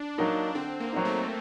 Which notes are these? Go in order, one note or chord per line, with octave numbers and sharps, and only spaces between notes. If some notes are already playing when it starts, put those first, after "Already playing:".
Already playing: D4
F#3 A#3 D#4
D3 C4
A#3
F#3 C4 D#4
A3